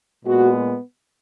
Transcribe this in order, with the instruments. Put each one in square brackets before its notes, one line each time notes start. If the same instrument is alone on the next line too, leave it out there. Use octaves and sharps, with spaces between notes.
[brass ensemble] A#2 G#3 B3 F#4